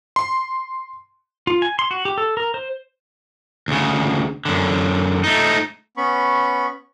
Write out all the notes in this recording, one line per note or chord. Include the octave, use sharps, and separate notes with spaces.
C6
F4
G#5
C6
F#4
G4
A4
A#4
C5
D2 C#3
F#2 D3
A3 D#4
B3 C#4 B5 C#6